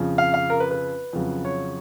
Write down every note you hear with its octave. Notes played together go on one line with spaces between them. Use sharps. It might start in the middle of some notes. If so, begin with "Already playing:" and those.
Already playing: F2 C#3 F3
F5
F5
A#4
B4
B4
F2 C#3 F#3
C#5